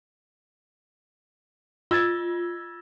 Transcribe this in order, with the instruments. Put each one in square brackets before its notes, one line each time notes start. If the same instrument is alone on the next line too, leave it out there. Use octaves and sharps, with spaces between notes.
[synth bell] F4 [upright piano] E6 G#6 A6